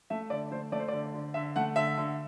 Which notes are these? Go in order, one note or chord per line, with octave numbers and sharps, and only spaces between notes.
A3 E5
D3 D5
A3 C5
A3 D5
C5
D3 D5
D3
D3 E5
A3 F#5
D3 E5
D3